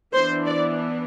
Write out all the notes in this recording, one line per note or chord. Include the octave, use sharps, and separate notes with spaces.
E3 B3 D4 C5
D5